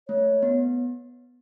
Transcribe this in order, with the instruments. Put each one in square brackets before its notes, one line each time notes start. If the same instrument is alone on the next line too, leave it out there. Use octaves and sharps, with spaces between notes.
[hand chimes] A3 [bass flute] C#5
[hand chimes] B3